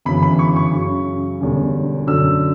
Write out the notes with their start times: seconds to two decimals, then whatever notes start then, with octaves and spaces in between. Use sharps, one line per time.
0.05 G1 F#2 C#3 E3 B5
0.23 B5
0.39 C#6
0.56 C#6
0.72 F#2 C#3 F#3
1.41 E1 E2 D3 G3 C#4
2.07 F#2 D3 F#3 E6